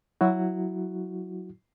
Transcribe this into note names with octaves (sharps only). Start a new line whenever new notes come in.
F#3 E4 F#4